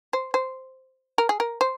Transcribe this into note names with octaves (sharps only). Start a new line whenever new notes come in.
C5
C5
A#4
G#4
A#4
C5